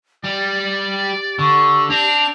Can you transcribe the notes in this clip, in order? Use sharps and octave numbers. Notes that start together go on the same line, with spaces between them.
G3 G4 D5
D3 C#6
C4 D4 F7